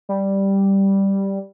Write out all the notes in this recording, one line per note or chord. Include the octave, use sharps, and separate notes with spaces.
G3